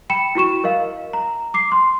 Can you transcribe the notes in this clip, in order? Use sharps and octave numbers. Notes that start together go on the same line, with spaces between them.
G5 B5 C#7 E7
E4 F#4 C#6 E7
A#4 D#5 F5
A#5
D6 C7
C6